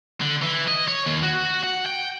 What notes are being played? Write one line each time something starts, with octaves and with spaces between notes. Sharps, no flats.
D3
E3
D#5
C#5
D#2
F#4
F#5
G5